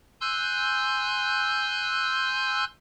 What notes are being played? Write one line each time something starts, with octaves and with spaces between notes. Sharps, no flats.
G#5 C6 E6 F#6 G6